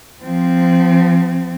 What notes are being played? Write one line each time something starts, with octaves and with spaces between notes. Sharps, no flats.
F3 C4